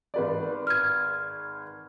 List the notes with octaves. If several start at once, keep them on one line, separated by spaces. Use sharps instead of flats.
G#1 B4 D5
F6 G#6